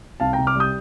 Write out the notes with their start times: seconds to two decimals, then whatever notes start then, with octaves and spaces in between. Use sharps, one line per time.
0.20 C2 F5 A5
0.33 C2 G5 A#5
0.47 D6 F6
0.55 G3 D#6 G6